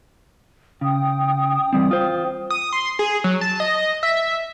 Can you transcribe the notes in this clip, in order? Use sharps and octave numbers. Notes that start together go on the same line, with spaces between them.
C#3 G5 D#6
E2 G3 C4
F4 C5
D#6
C6
G#4
F#3
A5
D#5
E5